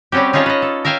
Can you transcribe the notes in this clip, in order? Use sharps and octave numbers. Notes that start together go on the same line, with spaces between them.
G3 C4 C#4 F#4 G4
C#4 D#4 F4 G#4 C#5 A5
B4 D#5
A4
A#4 E5 F5 G5 G#5